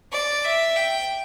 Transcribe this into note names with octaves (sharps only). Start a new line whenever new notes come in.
D5
E5
G5